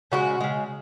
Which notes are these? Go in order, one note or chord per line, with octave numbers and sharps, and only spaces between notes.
C#3 G#3 F#4
C#3 G#3